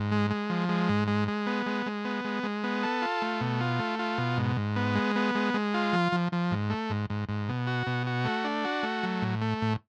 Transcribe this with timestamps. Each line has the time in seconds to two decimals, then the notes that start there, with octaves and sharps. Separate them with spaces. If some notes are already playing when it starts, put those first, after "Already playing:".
Already playing: G#2
0.12 G#3
0.30 G#3
0.50 F3
0.69 G#3
0.89 G#2
1.08 G#3
1.28 G#3
1.47 B3
1.66 G#3
1.86 G#3
2.05 B3
2.25 G#3
2.43 G#3
2.64 B3
2.83 A4
3.02 F4
3.22 A3
3.41 B2
3.61 F4
3.79 A3
3.99 F4
4.18 B2
4.37 G#2
4.57 G#2
4.76 B3
4.95 G#3
5.16 B3
5.35 G#3
5.54 G#3
5.74 F4
5.93 F3
6.12 F3
6.32 F3
6.51 G#2
6.70 A3
6.90 G#2
7.10 G#2
7.29 G#2
7.49 B2
7.67 F#4
7.87 B2
8.07 F#4
8.25 A3
8.44 D4
8.65 F#4
8.83 A3
9.03 F#3
9.22 A2
9.42 A3
9.62 A2